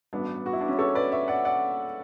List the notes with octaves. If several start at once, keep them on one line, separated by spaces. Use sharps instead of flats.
A1 G2 F#3 B3 D4
F#4
E4
D4
C#4 E4
A4 C#5
B4 D5
C#5 E5
D5 F#5
D5 F#5